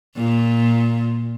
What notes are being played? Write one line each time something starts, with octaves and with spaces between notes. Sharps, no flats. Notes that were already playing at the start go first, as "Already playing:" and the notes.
A#2